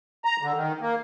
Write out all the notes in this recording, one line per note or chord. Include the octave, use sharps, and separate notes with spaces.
A#5
D3
D#3
A#3